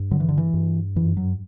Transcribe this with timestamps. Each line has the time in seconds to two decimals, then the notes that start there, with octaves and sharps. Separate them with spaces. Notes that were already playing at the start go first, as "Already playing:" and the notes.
Already playing: G2
0.11 D3 F#3
0.20 E3
0.29 D3
0.38 E3
0.54 G2
0.96 F#2 E3
1.17 F#3